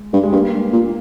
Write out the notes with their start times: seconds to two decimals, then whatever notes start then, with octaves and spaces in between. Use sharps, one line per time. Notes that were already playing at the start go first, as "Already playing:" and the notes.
Already playing: G#3
0.13 G2
0.23 G#3
0.32 G2 G3 A#3
0.73 A#2